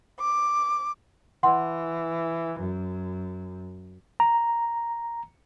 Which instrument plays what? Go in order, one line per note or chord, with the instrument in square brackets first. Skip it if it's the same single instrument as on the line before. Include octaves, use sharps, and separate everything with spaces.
[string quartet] D6
[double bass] E3 [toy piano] F#5 C6
[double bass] F#2
[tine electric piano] A#5